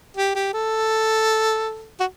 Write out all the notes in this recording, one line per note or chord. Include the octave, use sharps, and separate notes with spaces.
G4
G4
A4
F#4